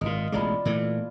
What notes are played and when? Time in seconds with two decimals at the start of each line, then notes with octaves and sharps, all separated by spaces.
0.01 G#1 A#2 F4 D#5
0.32 E1 A1 G#3 D5 A5 B5
0.65 A#2 E3 A3